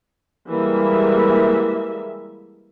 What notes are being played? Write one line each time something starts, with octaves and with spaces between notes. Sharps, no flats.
E3 G3 G#3 A#3 E5